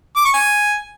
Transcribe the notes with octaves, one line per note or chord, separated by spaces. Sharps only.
D6
C#6
G#5